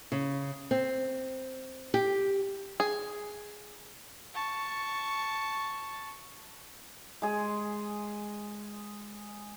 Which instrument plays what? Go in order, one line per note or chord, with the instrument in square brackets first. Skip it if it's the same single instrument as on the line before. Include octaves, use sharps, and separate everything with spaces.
[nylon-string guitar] C#3
C4
G4
[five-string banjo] G#4
[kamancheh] A5 C#6
[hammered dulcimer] G#3 G#4